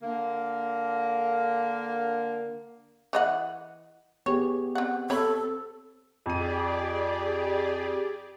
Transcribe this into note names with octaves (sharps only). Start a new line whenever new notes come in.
D3 A#3
E3 D#5 F#5
B3 G4 G#4 C#5
C4 F#5
C4 A4 C#5 B5
F2 G4 G#4 D5 D#7